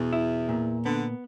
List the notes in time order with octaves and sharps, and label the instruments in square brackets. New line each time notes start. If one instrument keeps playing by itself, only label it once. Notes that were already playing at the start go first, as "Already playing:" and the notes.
Already playing: [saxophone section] E2 [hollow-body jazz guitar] B2
[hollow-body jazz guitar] E4
A#2
[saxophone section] D3 [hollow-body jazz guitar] B3